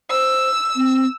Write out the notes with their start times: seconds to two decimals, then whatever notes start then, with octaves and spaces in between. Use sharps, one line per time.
0.11 C5 E6
0.76 C4